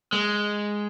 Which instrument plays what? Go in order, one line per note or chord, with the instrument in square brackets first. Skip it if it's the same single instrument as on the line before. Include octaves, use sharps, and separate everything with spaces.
[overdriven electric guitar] G#3